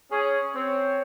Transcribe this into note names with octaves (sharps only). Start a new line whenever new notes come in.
C#4 G#4
C4 C#5